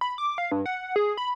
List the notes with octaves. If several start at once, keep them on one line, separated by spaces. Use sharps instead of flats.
B5
D6
F5
G2
F#5
G#4
B5